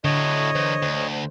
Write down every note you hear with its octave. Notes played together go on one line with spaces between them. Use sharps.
A2 D3 F#3 C#5 D#5
E2 C5
D2